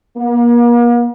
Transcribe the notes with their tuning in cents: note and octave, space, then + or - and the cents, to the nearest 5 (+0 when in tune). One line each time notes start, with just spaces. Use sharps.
A#3 +40